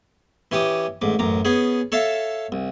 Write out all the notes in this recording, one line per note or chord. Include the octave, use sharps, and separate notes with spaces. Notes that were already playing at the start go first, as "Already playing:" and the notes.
E3 C#4 G4 D6 D#6
A1 G#2 D6
A1 F#2 A#5 D6
B3 C#4 G#4
A4 C#5 E5 F5 A5
C2